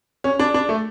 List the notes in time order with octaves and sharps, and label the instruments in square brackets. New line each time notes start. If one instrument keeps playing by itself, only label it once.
[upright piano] C#4
D4
D4
A3